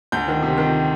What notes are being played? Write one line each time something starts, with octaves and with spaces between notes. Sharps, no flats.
D2 G6
D#3
C3
D#3